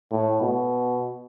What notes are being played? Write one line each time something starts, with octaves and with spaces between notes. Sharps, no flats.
A2
B2